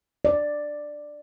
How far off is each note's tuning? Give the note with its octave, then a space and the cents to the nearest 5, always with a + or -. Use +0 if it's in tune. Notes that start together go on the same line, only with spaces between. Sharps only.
D5 +5